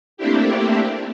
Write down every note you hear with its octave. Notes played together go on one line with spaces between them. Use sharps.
A3 A#3 C4 D4 E4 G4